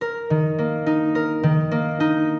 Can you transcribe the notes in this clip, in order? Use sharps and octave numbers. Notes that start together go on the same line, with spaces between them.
A#4
D#3
A#3
D#4
A#4
D#3
A#3
D#4